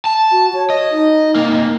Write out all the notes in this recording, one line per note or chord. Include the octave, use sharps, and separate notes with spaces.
A5
F#4
C#5
D#5
D#4
C3 A#3